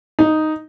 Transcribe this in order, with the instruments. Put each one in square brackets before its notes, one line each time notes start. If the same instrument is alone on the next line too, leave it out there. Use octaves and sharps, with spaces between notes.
[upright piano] D#4